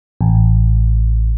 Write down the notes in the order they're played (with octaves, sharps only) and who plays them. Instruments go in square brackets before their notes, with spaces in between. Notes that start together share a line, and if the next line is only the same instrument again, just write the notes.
[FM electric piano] A1